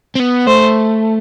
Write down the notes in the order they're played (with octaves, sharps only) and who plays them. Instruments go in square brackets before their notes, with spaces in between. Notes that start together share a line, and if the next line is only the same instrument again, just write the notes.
[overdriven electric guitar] C4
B3
[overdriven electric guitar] A3 [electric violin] C5